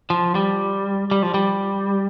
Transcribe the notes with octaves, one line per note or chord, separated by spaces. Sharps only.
F3
G3
G3
F3
G3